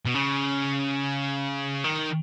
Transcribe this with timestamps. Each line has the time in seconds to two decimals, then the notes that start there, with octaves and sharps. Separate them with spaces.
0.06 B2
0.15 C#3
1.84 D#3